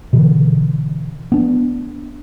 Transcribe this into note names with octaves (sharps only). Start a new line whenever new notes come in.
B2 D3 E3
B3 D4